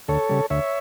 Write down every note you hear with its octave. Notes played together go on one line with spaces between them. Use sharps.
D2 A4 C#5
C#3 G3
D2 C#5 E5